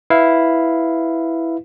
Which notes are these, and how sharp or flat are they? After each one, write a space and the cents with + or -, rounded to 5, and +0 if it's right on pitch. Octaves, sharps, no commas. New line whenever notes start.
E4 +0 B4 +0 F5 +0